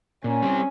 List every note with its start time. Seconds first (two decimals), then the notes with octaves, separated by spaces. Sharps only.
0.24 A#2 C#4
0.42 G3 C4